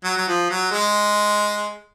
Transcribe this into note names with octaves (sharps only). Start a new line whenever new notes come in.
F#3
F#3
F3
F#3
G#3